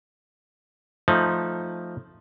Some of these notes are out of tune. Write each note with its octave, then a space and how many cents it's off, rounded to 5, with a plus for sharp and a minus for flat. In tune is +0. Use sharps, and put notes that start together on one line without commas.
F3 +0 A3 +0 D#4 +0